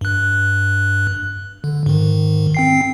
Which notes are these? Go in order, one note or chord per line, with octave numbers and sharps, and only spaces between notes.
G2 F#6
D3
G#2 D#3
C4 G5 C7